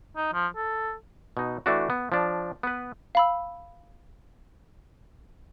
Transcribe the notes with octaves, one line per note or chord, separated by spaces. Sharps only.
D#4
F3
A4
B2 D#4
E3 A3 D4 F#4
B3
F3 D4
B3 B4
F5 B5 E6